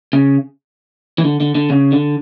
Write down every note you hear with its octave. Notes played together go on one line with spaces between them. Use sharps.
C#3
E3
D3
D3
D3
C#3
D3